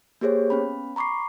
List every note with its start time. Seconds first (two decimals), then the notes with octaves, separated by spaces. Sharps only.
0.21 A#3 G4 G#4 C5 C#5
0.50 B3 C#4 B5
0.96 A#5 B5 C#6 D6 C7